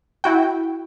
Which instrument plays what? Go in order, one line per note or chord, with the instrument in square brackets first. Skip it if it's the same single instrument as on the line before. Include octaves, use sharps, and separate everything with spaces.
[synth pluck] E4 F#4 G5